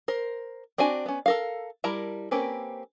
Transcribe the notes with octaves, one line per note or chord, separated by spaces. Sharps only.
A#4 C5
C4 D4 F#4 G#5
B3 C#4
A4 A#4 F5
G3 E4 A#4 A5 A#5
A#3 C4 C#4 G4 B4